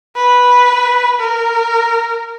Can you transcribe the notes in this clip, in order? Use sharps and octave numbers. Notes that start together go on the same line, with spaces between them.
B4
A#4